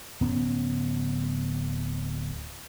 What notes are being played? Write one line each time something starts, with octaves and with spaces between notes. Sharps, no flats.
D1 B3 C#4